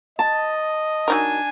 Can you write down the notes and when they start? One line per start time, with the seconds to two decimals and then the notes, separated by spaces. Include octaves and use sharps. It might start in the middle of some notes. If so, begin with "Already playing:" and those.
0.19 D#5 A5
1.08 F#3 D4 D#4 A#4 G#5